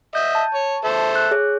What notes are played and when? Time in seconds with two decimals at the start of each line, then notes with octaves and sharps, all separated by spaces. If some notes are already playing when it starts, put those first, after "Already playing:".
0.15 D#5 E5 G6
0.35 A5
0.54 C#5
0.84 A4 C5 E5
1.15 F#6
1.31 G#4 C#5